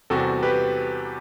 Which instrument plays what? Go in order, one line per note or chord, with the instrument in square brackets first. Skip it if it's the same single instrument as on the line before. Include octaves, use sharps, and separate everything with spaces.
[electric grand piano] E2 C3 G3 C4 F#4 A4
G4 B4